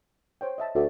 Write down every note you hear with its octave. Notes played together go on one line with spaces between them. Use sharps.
C5 C#5 G5
D#5 E5 A5
D2 F#4 D5 E5